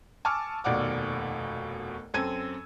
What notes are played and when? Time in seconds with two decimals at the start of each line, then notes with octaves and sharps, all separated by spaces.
0.25 G#5 A5 C#6 D6 E6 F6
0.64 F1 D#2 B2 D5 F#5 D6
2.14 F#2 C4 A4 E6 G#6 D#7